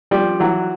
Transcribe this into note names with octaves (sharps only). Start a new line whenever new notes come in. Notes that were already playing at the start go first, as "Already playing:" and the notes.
F3 G3
E3 F#3